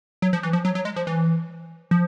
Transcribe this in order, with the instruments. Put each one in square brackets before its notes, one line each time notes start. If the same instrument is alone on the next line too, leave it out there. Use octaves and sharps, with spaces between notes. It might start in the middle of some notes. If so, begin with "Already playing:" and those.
[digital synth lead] F#3
F3
E3
F3
F#3
F#3
G#3
F3
E3
F3